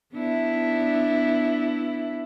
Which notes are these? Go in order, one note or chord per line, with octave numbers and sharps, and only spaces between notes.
B3 D4 E4